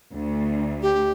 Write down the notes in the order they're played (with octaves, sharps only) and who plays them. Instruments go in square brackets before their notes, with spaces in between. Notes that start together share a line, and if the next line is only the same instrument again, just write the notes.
[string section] D2
[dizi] G4